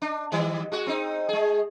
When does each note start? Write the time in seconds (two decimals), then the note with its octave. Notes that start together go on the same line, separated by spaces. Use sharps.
0.02 D4
0.32 D#3 G3
0.72 G#3 F#4
0.87 C4 D#4
1.29 G#3 G#4